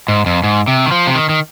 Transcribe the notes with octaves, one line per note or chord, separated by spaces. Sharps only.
G#2
F2
G#2
C3
D#3
F3
C3
D#3
D#3